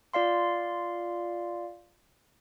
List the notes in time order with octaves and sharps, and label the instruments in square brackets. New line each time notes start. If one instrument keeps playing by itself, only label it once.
[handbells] F4 D5 F5 C6